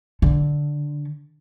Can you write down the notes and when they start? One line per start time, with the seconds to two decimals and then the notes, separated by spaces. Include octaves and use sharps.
0.22 D3